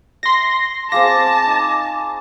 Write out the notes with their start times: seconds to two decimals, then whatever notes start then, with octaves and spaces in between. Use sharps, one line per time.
0.23 E5 C6 A#6
0.92 C4 G#4 F5 A5 D6 A#6
1.47 D#4